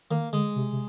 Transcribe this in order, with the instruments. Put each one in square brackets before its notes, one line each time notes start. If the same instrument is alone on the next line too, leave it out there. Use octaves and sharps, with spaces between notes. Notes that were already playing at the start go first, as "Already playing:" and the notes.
[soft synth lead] D#3 [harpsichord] A#3
[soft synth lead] D3 [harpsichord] G#3
[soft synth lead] C3
C3